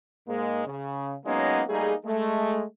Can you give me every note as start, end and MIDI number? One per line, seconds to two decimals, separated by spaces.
0.27 0.64 44
0.27 0.64 56
0.27 0.64 58
0.65 1.14 49
1.24 1.61 54
1.24 1.61 56
1.24 1.61 58
1.24 1.61 59
1.24 1.61 61
1.24 1.61 63
1.68 1.93 55
1.68 1.93 57
1.68 1.93 58
1.68 1.93 63
1.68 1.93 68
2.06 2.63 56
2.06 2.63 57